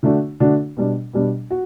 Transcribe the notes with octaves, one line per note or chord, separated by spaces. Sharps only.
D3 A3 D4 F#4
D3 A3 D4 F#4
B2 G3 D4
B2 G3 D4
F#4